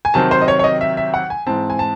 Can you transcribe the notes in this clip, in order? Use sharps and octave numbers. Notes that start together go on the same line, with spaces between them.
G#5
C3 D#3 F#3 C4 A5
C5
D#5
C#5
C#5
D#5
E5
E5
F#5
G#5
G#2 E3 C4 A5
G#5
A5